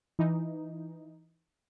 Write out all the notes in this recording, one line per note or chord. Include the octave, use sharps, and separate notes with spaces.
E3 D#4